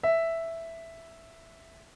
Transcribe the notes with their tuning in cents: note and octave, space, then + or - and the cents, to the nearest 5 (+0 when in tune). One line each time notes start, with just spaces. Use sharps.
E5 +0